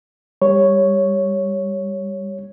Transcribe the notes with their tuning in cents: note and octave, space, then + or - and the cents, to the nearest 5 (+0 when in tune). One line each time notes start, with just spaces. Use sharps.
G3 +20 C#5 +0